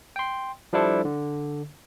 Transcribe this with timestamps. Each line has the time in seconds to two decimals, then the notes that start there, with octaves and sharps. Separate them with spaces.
0.16 G5 C6
0.73 F3 G3 D4 E4 A4 C5
1.05 D3